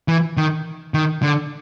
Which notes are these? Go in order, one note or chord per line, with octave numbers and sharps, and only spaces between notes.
E3
D#3
D#3
D3